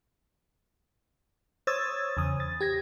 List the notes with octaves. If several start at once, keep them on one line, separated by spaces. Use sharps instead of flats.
C5 C#5 D#6 E6 G#6 A6
E2 C#3 D#6
A6
G4 G#6 A#6